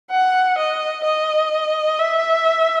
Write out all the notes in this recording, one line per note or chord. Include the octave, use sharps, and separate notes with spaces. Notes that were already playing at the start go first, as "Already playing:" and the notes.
F#5
D#5
D#5
E5